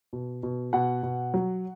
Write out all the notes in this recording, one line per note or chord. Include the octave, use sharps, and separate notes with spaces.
B2
B2
B2 F#5
B2
F#3